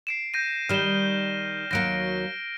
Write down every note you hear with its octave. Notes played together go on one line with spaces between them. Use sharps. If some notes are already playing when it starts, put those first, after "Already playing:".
C7 D7 E7
G6 A#6 D#7
D#3 G3 F6 E7 G7
D#2 F#3 A#3 A#6 D7